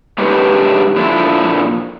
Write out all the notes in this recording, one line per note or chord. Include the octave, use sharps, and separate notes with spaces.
G#3 D4 D#4 G4 B4 C#5
A#2 F3 D4 E4 A4